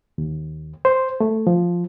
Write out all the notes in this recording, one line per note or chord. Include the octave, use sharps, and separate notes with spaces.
D#2
C5
A3
F3